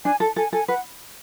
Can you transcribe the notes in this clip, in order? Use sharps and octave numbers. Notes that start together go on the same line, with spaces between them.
D4 G#5
A4 A5
A4 G#5
A4 G#5
B4 F#5